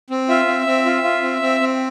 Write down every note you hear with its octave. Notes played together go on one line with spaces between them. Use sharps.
C4
F4 E5
C4
C4
F4
F4
C4
C4
C4